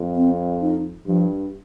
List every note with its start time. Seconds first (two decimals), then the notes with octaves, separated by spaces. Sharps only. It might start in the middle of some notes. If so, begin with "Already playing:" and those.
Already playing: F2
0.16 C4
0.61 D#4
1.06 G2 F3